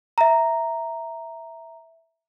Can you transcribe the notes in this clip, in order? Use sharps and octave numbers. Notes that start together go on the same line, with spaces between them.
E5 A#5